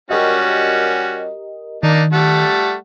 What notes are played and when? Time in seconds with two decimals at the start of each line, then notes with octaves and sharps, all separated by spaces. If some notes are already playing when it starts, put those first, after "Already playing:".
0.11 G3 C#4 F#4 G4 A#4 D#5
1.83 D#3 A#3 D4 D#4
2.13 G3 A3 F#5